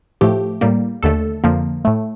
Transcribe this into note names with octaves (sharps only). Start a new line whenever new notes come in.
A2 F3 A3 G4
A2 G3 A#3
D#2 D3 A3 A4
F2 D3 F3 A#3
A2 A3